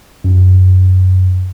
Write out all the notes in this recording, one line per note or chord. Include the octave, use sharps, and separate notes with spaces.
F#2